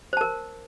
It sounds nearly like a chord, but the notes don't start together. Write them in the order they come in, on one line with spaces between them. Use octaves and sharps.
C5 A5 A#4